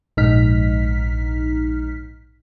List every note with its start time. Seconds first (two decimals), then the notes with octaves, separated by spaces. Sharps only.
0.17 A#1 G#2 D#4 F6 B6